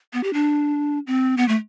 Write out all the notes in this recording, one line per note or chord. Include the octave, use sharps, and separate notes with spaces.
B3
G4
D4
C4
B3
A3